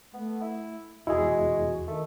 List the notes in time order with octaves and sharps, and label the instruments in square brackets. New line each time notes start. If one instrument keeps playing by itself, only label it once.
[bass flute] A3 [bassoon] B3
[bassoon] E4
[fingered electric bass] F1 E2 [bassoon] G#3 [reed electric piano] E4 G#4 [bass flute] F#4
[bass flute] D#3 [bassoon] A3